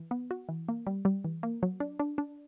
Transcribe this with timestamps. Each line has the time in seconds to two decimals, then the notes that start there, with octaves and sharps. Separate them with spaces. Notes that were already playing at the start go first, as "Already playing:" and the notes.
Already playing: E3
0.11 B3
0.31 F#4
0.49 E3
0.69 A#3
0.87 G3
1.05 G3
1.24 E3
1.43 A#3
1.63 F#3
1.80 D4
2.00 D4
2.18 D4